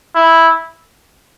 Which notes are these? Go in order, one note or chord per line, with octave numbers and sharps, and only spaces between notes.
E4